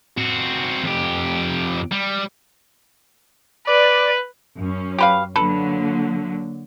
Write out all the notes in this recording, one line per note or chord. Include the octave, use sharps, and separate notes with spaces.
C4 F#4
F2 G4
G3
B4 D5
F#2 C#4
G4 B4 F5
D3 F#3 A#3 A4 B4